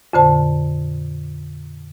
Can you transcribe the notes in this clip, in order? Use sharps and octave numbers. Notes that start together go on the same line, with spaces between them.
F2 A#2 D3 C5 A5